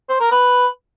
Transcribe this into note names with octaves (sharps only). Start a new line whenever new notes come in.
C5
A#4
B4